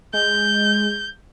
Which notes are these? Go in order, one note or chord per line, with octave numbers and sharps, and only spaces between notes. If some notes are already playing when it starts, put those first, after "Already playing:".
G#3 G6